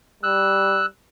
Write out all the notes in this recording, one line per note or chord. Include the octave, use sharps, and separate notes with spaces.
G3 E6 F#6